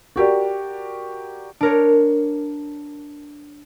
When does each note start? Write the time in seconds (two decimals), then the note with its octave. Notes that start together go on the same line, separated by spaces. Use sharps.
0.16 F#4 G4 A#4 D5
1.61 D4 A#4 C#5